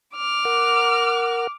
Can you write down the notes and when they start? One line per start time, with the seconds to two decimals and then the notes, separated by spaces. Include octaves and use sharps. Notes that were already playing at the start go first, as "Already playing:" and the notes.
0.16 D6 F6
0.45 A#4 F#5